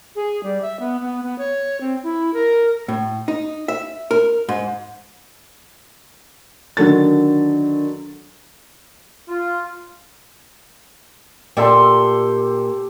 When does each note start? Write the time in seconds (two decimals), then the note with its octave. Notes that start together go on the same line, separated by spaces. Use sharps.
0.15 G#4
0.43 G3
0.62 E5
0.80 B3
1.01 B3
1.23 B3
1.38 C#5
1.81 C4
2.03 E4
2.34 A#4
2.88 A2
3.28 D#4
3.68 E5
4.11 A#4
4.49 G#2
6.77 D3 D#3 F#3 A4 A6
9.28 F4
11.57 A#2 G4 A4 D5 E5 C6